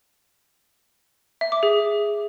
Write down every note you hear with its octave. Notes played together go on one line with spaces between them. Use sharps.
E5
D6
G#4